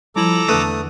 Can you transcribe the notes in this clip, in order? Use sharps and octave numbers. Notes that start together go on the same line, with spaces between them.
F3 G3 E4 A4 A#5 D6 F#7
E2 D3 A3 B4 D#6 F#6